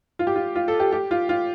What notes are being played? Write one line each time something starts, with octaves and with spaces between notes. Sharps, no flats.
F4
G4
F4
F4
A4
G4
G4
F4
F4